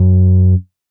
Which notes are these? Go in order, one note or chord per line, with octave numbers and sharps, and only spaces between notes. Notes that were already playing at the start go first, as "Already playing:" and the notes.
Already playing: F#2